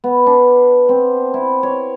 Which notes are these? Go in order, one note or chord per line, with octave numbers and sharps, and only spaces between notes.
B3
D4
C4
E4
C#5